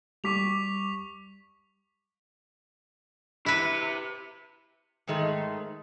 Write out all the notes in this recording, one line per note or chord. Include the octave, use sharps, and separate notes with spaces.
G3 C#6 D6 B6 F7
E4 G4 B4 E5
G#2 D#3 G#3 A3